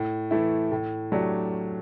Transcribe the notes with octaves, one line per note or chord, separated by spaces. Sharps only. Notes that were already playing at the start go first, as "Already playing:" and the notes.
Already playing: A2
E3 A3 E4
A2
F#3 A3 D4 G4